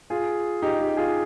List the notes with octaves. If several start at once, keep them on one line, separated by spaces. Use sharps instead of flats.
F4 G#4
D#4 G4
D#4 G4
F4 G#4